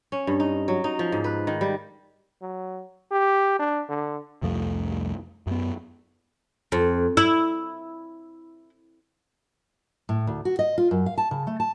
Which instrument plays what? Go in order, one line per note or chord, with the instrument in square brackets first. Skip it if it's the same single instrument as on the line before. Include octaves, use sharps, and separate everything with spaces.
[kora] C#4
G2
D#4
F#3
D#4
F3
G#2
B4
D#3
G3
[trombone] F#3
G4
D4
D3
[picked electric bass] C2 F2 F3 A3
F#2 B3
[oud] F2
E4
[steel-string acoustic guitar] A2
D2
F#4
D#5
F4
F#2
F5
A5
C#3
A3
A5